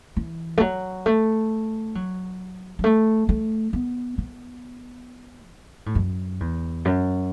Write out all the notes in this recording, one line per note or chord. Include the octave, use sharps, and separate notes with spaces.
E3
A3
F#3
A3
F#3
F#3
A3
A3
B3
B3
B2
A2
F#2
E2
F#2